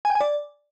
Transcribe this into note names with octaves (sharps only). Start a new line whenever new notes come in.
G#5
G5
G#5
D5